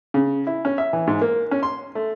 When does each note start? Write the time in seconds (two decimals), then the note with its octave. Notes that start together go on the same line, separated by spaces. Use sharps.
0.14 C#3
0.47 E4
0.65 C#4
0.78 E5
0.93 E3
1.07 G#2
1.21 A#3
1.51 C#4
1.63 C6
1.95 A3